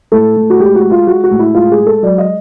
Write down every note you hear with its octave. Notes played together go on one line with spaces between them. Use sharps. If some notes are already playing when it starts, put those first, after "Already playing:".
A2 A4
A2
F#4
G#3 G4
F#4
G#3
F4
G#3 F#4
F#4
A2
E4
G#3 F4
G#4
G#3
A4
F#3 D5
D#5